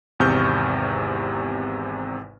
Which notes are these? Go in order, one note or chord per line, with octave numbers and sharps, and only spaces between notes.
G#1 E2 C3 C#6 F6 G6